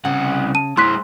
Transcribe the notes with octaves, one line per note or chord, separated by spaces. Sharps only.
C2 C#3 F#5
A5 D#7
G#3 E4 C6 F#6 B6